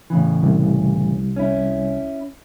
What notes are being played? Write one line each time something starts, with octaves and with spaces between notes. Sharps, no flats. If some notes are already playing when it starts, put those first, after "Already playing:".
A2 C#3 E3
C2
C#4 E4